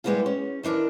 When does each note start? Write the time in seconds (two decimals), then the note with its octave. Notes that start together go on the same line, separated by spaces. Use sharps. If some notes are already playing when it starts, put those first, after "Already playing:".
0.04 G3 G#3 A#3 B3 E4 F4
0.26 C#4
0.63 D#3 E3 D4 A#4 A5